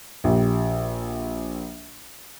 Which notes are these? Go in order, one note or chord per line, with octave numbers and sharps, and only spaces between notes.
A#1 G4